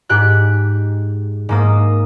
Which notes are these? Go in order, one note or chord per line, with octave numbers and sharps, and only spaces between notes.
G#2 G4 F#6
G#2 A#3 D#6